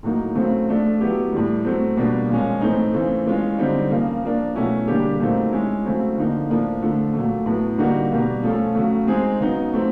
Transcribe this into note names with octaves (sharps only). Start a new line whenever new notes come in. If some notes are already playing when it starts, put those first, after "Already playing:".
A2 F#3 A#3 D#4
C#3 F#3 A3 C4
F3 A3 D4
F#3 B3 E4 G4
A2 E3 G3
F#3 A3 C4
B2 G3 A#3 D4 F4
A#2 F3 G#3 C#4
A2 E3 A3 C4 D#4
C#3 E3 A3 C4
E3 G#3 C#4 F4
D3 G3 C4 D#4
C#3 F3 A#3
F3 A#3 D4
B2 F#3 A3 C#4 E4
D3 G3 A#3 D4 G4
A#2 F#3 A3 C4 D#4
G#3 C#4 E4
C#3 F#3 A3 C4 E4
D3 F3 A#3 D#4
A2 F3 A#3 D4
D3 F3 A3
A#2 F#3 A3
A2 F#3 B3
D3 G3 A#3 D#4 F#4
B2 G3 A#3
F3 A3 C#4 F4 A4
C#3 F#3 A3
G#3 C4 D#4 G#4
C#3 F#3 B3 D#4
F#3 A3 C4 F4